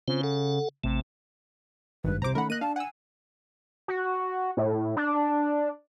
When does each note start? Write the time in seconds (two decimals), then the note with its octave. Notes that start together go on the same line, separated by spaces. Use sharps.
0.08 C#3 C4 F4 C5
0.23 A4 F#5
0.84 A1 C3 A3
2.04 G#1 G2 B4
2.22 C2 C3 C5 A#5 D6
2.35 D#3 A3 C#4 A#4 F#5 B5
2.50 A#3 D#5 F#6 D#7
2.61 D4 F5 A5
2.76 F#5 G#5 E6
3.88 F#4
4.57 A2
4.97 D4